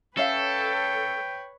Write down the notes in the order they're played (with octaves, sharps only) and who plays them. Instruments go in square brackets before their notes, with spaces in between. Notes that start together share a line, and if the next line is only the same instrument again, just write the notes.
[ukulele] C#4 E5 F5 [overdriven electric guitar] A4 [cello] B4 C#5 [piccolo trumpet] G5